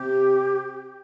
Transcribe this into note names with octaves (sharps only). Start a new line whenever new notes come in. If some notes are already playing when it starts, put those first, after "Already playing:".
Already playing: C3 G4